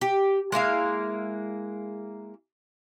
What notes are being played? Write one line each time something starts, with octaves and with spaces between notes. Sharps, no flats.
G4
G#3 A#3 E4 F5